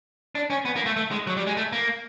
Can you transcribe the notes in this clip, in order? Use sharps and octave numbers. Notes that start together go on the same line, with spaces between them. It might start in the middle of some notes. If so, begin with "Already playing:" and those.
D4
C#4
B3
A#3
A3
A3
G#3
F#3
G3
G#3
A3
A#3